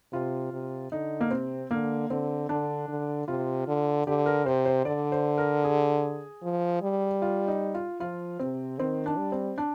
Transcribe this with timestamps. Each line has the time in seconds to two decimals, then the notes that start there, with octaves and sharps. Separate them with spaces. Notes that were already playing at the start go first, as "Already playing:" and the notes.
0.12 C3 F4
0.53 C3
0.92 D3 D#4
1.21 A#3
1.30 C3 C4
1.71 D3 A#3
2.10 D3 C4
2.49 D3 D4
2.89 D3
3.28 C3 F4
3.68 D3
4.07 D3 G4
4.26 A#4
4.46 C3 C5
4.65 C5
4.85 D3 D5
5.12 C5
5.38 A#4
5.64 G#4
6.42 F3
6.82 G3
7.22 F4
7.48 D#4
7.74 F4
8.00 F3 F4
8.39 C3 C4
8.79 D#3 C4
9.06 D4
9.18 G3
9.32 C4
9.58 D4